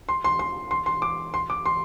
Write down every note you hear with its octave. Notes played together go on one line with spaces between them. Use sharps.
C6
C6
C6
C6
C6
D6
C6
D6
C6